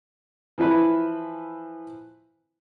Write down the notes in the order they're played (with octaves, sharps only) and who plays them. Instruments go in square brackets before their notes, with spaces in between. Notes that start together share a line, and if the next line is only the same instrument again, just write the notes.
[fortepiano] E3 F3 E4 B4